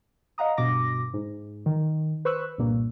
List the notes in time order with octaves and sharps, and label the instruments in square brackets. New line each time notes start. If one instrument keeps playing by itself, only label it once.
[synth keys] D#5 F5 F#5 A#5 D#6
G2 B2 D6 A#6
G#2
D#3
B4 C5 C#6 E6 F#6
C2 G2 A#2 A#3